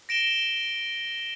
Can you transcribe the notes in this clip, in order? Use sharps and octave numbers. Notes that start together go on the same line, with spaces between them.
A#6 D7 E7 G7